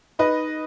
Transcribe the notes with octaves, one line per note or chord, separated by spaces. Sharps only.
D#4 B4 D#5